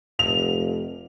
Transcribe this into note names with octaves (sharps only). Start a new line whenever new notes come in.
F1 F7